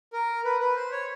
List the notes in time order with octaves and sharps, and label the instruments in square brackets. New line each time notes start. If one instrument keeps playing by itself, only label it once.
[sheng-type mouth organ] A#4
B4
B4
C5
C#5